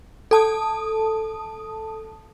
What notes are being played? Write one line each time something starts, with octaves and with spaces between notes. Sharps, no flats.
A4 A5 D#6